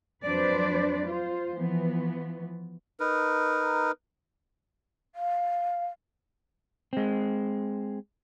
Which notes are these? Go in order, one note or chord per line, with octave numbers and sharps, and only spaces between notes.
F2 F#3 D4 B4 C5 D5
F4 C5
E3 F3 B3
D#4 A#4 B4
F5
G#3 C4